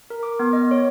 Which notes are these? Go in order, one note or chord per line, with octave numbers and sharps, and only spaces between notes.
A#4
D6
B3
D#5
C#5